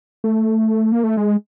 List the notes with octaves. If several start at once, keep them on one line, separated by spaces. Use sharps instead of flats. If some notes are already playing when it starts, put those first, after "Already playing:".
A3
A#3
A3
G#3